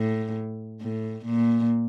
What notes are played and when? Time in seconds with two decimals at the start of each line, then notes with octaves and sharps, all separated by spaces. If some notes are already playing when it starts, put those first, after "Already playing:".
Already playing: A2
0.81 A2
1.26 A#2